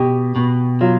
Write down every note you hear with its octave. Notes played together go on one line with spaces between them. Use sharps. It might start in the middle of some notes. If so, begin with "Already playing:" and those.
Already playing: B2 G4
B2
F#3 F4